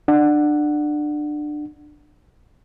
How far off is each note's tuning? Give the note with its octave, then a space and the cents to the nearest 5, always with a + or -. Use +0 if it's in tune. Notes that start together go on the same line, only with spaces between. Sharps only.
D4 +25 F#5 +0